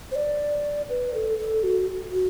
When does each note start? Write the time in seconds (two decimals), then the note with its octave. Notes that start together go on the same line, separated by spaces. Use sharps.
0.11 C5
0.15 D5
0.89 B4
1.14 A4
1.38 A4
1.63 F#4
2.13 F#4